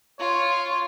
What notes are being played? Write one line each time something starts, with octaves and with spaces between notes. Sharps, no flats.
F4 C#5